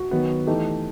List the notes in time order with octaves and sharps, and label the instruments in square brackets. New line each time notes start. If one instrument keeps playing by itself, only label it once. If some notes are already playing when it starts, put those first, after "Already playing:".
Already playing: [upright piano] F#4
D#3 F#3 B3
E3 A3 D#4 G4